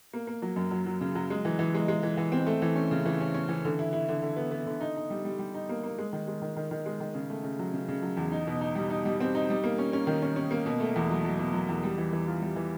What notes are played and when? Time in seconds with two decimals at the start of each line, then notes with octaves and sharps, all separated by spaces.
0.13 A#3
0.27 A#3
0.42 F#3
0.56 F#2
0.71 F#3
0.86 F#3
1.01 C#3
1.15 F#3
1.30 G#3
1.45 E3
1.59 E3
1.74 G#3
1.88 G#3
2.03 E3
2.17 E3
2.32 C4
2.47 A3
2.62 E3
2.76 C#4
2.91 C#3
3.06 E3
3.21 C#4
3.35 C#4
3.49 E3
3.65 D3
3.79 E4
3.93 E4
4.08 D3
4.22 D3
4.36 B3
4.51 B3
4.66 D3
4.81 D#4
4.96 D#4
5.10 G3
5.25 G3
5.39 G3
5.54 D#4
5.69 A#3
5.83 A#3
5.98 G#3
6.13 D#3
6.27 G#3
6.42 D#3
6.56 D#3
6.71 D#3
6.86 G#3
7.00 D#3
7.15 C#3
7.30 A3
7.44 C#3
7.59 F#3
7.74 C#3
7.88 C#3
8.03 F#3
8.17 E2
8.32 D#4
8.47 B2
8.61 D#4
8.75 G3
8.90 D#4
9.05 G3
9.20 C4
9.35 D#4
9.50 G3
9.64 A#3
9.78 C#4
9.93 C#4
10.07 D#3
10.22 C#4
10.36 C#4
10.51 A#3
10.66 B2
10.80 A3
10.96 E2
11.10 F#3
11.25 F#3
11.39 B2
11.54 F#3
11.69 E2
11.83 G3
11.98 E3
12.13 E3
12.27 F4
12.42 G3
12.56 E3